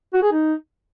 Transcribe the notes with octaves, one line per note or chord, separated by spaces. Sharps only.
F#4
G#4
D#4